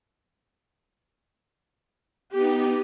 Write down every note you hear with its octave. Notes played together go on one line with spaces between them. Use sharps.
B3 D#4 G4